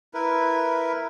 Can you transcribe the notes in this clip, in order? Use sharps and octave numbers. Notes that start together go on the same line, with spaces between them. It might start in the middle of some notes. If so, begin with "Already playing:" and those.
E4 A#4 B4